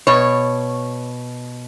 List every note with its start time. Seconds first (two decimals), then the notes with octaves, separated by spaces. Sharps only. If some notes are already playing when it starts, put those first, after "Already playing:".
0.07 B2 C#5